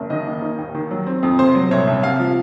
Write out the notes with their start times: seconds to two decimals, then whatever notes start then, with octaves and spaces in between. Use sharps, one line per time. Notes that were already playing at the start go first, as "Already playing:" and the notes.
Already playing: F#1
0.10 D#3 D#5
0.26 A#3
0.42 D#4
0.58 D#2
0.75 D#3
0.91 F#3
1.06 C4
1.23 F2
1.39 C3 C5
1.55 F#3
1.71 C2 C#5
1.87 C2
2.03 C3 F5
2.19 F3